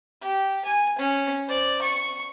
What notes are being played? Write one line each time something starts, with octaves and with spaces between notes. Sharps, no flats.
G4
G#5
C#4
C5 D5
C#6